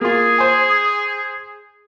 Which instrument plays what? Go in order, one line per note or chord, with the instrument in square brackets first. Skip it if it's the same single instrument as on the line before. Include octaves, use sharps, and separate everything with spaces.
[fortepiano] A#3 F4 [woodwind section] G#4
[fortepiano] C5 G#5